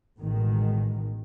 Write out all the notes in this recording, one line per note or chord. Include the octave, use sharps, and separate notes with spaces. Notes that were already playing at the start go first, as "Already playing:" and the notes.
A1 B2 D#3 G#3